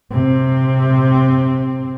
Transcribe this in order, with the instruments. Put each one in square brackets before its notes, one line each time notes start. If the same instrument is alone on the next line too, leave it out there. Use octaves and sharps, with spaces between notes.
[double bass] C3 C4